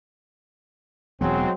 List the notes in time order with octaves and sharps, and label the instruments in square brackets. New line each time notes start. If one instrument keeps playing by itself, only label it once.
[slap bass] E1 E3 B3 [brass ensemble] F#3 G#3 C4